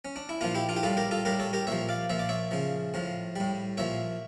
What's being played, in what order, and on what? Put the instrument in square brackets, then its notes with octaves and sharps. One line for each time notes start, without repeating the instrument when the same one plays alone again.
[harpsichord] C#4
D4
E4
A#2 F3 D4 F4
E4 G4
D4 F4
G4
A2 G3 F4 A4
G4 A#4
F4 A4
A2 G3 G4 A#4
A4 C#5
G4 A#4
A#2 F3 C#5 E5
D5 F5
A#2 F3 E5
D5
C#5 E5
C#3 F3
A2 F3
A2 G3
A#2 F3 C#5 E5